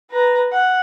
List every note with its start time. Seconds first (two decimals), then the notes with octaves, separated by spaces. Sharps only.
0.10 B4 A#5
0.52 F#5